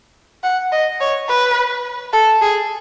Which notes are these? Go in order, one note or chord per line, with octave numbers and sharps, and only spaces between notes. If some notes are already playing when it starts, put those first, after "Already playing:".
F#5
D#5
C#5
B4
A4
G#4